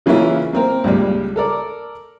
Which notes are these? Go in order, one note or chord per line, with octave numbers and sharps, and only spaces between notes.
C#3 E3 A#3 C#4 E4 F4
A#3 C4 A#4
C#2 G2 A#2 G3
A4 A#4 D5